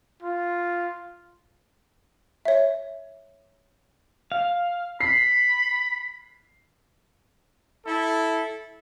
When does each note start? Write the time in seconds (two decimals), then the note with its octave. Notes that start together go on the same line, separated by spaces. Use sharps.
0.23 F4
2.45 C#5 E5
4.32 F5
5.00 B5 C7
7.85 E4 A4